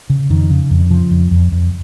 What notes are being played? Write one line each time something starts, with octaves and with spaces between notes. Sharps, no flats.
C#3
F2 D#3
C#3
F2
C#3 F3
F2
F2
F2